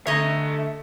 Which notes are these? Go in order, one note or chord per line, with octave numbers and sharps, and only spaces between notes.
D3 A3 C#5 D#5 E5 A#5